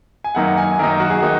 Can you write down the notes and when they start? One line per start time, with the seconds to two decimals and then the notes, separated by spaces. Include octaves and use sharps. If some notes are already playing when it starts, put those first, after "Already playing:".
0.24 G#5
0.35 F#2 D#3 A#3 D#4 F#5
0.58 G#5
0.79 F#2 D#3 A#3 D#4 A#4
1.00 F#4
1.10 G#4
1.19 D#3 A#3 D#4 F#4